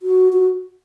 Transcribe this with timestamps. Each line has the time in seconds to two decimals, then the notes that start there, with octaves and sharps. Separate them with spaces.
0.02 F#4
0.33 F#4